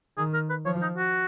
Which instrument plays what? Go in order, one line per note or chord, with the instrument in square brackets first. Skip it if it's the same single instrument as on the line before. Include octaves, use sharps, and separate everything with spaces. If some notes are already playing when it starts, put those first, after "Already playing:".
[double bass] D#3 [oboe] G#4
[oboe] A#4
B4
[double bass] F3 [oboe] C#5
[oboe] D#4
F#4